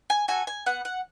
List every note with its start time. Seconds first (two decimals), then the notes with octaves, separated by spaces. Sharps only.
0.10 G#5
0.28 F#4 A4 G#5
0.47 G#5
0.66 B3 F#5
0.85 F#5